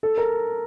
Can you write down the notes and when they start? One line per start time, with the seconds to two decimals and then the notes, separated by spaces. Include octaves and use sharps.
0.03 A4
0.18 A#4